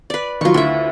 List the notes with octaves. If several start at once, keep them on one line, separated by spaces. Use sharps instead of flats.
B4 D5
D#3 F#3 F4 C#6
D2 E4 E5